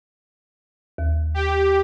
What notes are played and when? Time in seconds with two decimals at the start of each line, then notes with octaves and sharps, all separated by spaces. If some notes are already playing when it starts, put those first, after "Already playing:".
0.98 D#2
1.34 G4